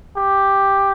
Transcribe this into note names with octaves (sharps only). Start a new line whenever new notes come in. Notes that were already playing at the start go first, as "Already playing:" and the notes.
G4